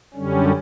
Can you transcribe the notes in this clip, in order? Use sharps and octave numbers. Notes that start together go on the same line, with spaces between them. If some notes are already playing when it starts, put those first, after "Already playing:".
F#2 D3 G3 C#4